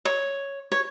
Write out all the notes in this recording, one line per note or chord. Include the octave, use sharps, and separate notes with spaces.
C#5
C#5